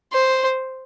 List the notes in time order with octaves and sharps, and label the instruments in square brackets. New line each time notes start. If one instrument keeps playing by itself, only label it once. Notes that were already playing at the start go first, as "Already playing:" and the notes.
[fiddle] C5